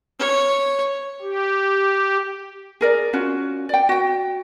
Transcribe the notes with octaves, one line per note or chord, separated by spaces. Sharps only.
C#5
G4
G#4 A#4 D5
C#4 F4 F#4
D5 G5
F#4 G5